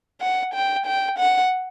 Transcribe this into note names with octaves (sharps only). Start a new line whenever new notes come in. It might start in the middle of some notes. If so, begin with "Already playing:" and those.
F#5
G5
G5
F#5